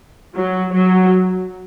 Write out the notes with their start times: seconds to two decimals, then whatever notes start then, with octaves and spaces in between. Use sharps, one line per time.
0.36 F#3
0.73 F#3